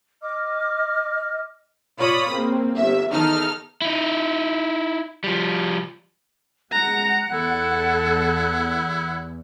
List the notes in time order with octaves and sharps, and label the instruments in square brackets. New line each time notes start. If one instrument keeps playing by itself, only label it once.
[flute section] D#5 D6 F6
[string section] F4 C#5 D5 B5 D#6
C#3 A#3 C4
G1 E5
E2 D#3 D#4 A4 F6
[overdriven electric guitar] D#4 E4
F3 G3
[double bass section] G#3 [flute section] F#5 F#6 [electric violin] A#5
[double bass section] E2 [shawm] E4 [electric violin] A4